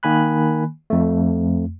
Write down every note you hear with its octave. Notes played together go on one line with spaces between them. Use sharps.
D#3 A#3 G#5 B5 F#6
F2 A3